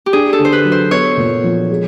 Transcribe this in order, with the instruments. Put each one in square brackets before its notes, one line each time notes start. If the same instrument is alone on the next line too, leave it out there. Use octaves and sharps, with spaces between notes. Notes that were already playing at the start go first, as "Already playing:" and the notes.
[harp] G4
[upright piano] D4 [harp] G#4
[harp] A4
[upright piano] D3
[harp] C5
B4
[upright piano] F#3
[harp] C5
[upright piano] B3 [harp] C#5
[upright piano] A#2
F3
G#3